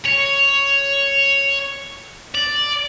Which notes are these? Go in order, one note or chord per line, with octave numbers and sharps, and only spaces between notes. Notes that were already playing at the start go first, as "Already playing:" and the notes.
C#5
D5